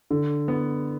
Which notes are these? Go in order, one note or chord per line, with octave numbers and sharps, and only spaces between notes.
D3
B3